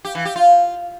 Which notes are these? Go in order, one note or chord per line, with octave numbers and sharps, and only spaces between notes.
G4
E3
G4
F4